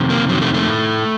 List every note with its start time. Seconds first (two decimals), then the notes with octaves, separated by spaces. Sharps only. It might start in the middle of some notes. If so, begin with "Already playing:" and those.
Already playing: F2 C3 D#3
0.10 A#3
0.29 F2 C3 D#3 F#3
0.42 A3
0.54 A3
0.67 A2